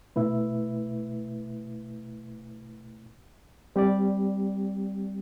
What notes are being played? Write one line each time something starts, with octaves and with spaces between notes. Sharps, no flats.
B2 A3 E4 B4 E5
G3 C4 G4 D5